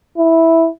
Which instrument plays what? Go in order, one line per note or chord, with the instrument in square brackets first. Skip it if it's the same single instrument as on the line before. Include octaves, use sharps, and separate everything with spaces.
[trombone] E4